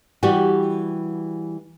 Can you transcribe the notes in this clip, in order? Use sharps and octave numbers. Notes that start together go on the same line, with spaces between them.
E3 G3 F#4 G4